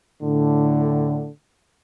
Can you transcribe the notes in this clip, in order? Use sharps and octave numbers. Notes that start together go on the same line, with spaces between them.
A2 D3